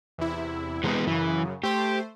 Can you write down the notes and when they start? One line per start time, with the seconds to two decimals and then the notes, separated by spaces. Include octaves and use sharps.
0.18 E2 C3 E4
0.84 C3 E3 G#3 B3
1.07 F#2 C#3 E3
1.64 A3 G4 C5